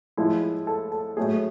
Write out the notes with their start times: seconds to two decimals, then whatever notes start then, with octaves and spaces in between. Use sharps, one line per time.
0.17 A2 F3 G#3 E4
0.67 A4
0.92 A4
1.17 A2 F#3 A3 G#4